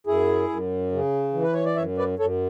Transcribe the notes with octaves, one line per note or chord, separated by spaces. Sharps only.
F#2 E4 G#4
F#2
C#3
E3
B4
C#5
D5
F#2 C#5 E5
B4 D5
F#2 A4 C#5